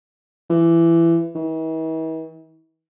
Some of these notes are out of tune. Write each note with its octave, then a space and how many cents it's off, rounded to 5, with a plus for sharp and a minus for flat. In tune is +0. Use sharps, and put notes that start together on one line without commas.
E3 +20
E3 -45